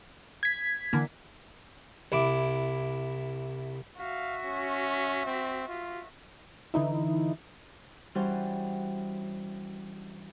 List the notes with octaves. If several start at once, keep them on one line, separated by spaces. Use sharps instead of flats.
G#6 B6
D3 E3 A#3
C2 E4 D6
F#4 E5 F5
C#4
C4
F4
D3 E3 D#4 E4
E3 G3 C#4 D4 F#4 C5